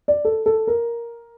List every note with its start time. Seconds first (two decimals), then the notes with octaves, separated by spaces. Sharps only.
0.08 D5
0.25 A4
0.46 A4
0.67 A#4